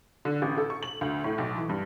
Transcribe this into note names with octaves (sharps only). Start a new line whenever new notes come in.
D3
A1
A4
C#6
F#7
D2
A2
B1
E3
G2